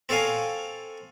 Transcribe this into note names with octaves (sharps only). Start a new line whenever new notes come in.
C4 A4 C#5 F5 G#5